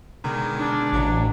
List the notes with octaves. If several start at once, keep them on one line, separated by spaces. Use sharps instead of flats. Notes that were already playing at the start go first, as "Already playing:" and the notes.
B2 D3 D#3 G#3
D4
A1 F#3